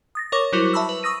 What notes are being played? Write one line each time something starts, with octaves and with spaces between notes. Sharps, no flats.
D#6 A6 A#6
A#4 C#5 C#6 D6 A#6
F#3 G3 E4 F#4 A#4 C5
E5 A5 B5 C#6 E6
B4
C#6 D#6 E6 A#6 D#7